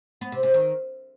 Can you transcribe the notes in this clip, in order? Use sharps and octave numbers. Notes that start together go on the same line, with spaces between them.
B3
C3
C3
D#3